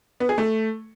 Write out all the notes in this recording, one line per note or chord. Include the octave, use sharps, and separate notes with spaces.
B3
G#4
A3